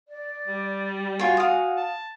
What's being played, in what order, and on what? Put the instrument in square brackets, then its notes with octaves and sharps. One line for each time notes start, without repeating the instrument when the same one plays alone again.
[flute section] D5
[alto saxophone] G3
[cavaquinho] F4 C#5 [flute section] F#4 G#5
[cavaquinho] F5 D#6
[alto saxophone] A5